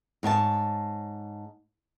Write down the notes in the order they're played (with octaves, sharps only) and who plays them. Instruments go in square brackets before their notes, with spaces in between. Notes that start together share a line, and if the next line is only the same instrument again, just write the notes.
[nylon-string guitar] G#2 C#5 G5 A5